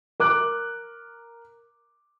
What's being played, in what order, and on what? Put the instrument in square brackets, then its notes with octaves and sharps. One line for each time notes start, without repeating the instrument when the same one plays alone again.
[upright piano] A#4 D6 F#6